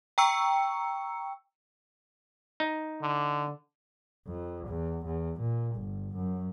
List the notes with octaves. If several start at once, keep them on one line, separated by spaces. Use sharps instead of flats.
G5 A#5 C#6 E6 C#7
D#4
D3
F2
E2
E2
A#2
G1
F#2